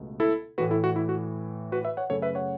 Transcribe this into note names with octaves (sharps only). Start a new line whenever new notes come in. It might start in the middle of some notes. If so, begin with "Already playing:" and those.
Already playing: C#2 B2 A3
E4 A4
A2 E3 A3 F#4 B4
E4 A4
F#4
E4
F#4
F#4 B4
B4 E5
C#5 F#5
F#2 C#3 A3 C#4 A4 C#5
B4 E5
C#5 F#5